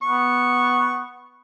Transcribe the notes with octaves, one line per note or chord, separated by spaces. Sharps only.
B3 C#6